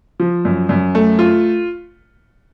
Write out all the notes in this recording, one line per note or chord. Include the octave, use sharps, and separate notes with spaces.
F3
F#2
F#2
A3
F4